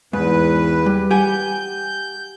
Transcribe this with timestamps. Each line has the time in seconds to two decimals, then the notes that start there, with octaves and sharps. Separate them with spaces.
0.13 E2 G#2 B4
0.86 G3
1.11 G4 F#5 G#5 G6